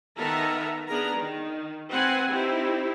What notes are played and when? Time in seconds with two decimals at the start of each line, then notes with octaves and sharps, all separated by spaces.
0.17 D#3 B3 A4 A#4 E5 A#5
0.87 B3 D4 G#4 A#4 A#5
1.17 D#3
1.90 C4 B4 F#5 G#5
2.31 C4 D#4 E4 G4